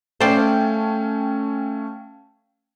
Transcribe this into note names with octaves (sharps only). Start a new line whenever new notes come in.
A3 C#4 C5 D5 F5 G5 A5